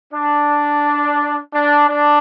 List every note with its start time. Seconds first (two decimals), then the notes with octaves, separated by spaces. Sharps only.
0.13 D4
1.53 D4
1.88 D4